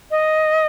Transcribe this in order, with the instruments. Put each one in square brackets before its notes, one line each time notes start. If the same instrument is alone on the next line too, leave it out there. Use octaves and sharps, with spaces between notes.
[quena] D#5